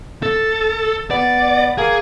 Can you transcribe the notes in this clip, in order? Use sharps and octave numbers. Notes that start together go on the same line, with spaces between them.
A4
B3 D5
A#3 G#4